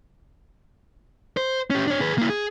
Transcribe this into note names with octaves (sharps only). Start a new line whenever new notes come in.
C5
C#4 G4
D4 C#5
G#4 B4
A#3 E4
G#4